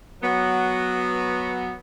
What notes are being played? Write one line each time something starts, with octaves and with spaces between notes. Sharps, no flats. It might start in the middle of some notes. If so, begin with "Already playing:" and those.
F#3 B3